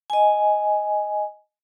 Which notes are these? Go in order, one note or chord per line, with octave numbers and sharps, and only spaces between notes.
D#5 G#5